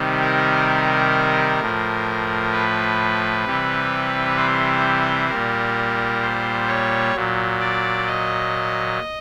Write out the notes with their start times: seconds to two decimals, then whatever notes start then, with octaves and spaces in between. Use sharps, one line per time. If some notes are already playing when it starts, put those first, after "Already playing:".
Already playing: C3 D#3 G3
0.21 A#4
1.60 A2 F3
2.52 B4
3.45 C3 E3 G3
4.37 C5
5.29 A#2 G3 A#4
6.22 C5
6.68 C#5
7.14 A#2 F#3
7.60 D5
8.07 D#5